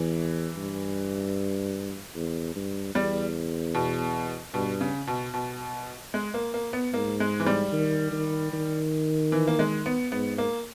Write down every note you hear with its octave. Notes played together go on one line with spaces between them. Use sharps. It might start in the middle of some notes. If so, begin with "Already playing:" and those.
Already playing: E2 E3
G2
E2
G2
E2 G3
B2
G2 B2
C#3
B2
B2
G#3
A#3
A#3
B3
G#2 A#3
G#3
E3
G3
D#3
D#3
D#3
E3
A#3
G#3
B3
G#2 B3
A#3